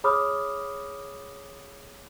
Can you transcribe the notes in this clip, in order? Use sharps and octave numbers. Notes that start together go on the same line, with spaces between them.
G#4 C#5 B5 D6 D#6 F6